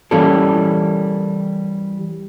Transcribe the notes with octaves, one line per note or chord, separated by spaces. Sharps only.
E3 G3 A#3 C#4 G4 A4